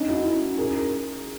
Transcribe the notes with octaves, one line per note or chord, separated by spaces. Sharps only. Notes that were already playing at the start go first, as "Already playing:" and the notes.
Already playing: C#4 D#4
E4 F#4
G#4 A#4